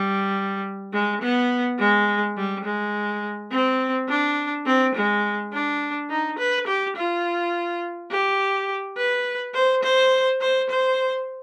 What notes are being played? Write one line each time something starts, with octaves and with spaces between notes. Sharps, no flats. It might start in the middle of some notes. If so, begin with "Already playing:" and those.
Already playing: G3
G#3
B3
G#3
G3
G#3
C4
D4
C4
G#3
D4
D#4
B4
G4
F4
G4
B4
C5
C5
C5
C5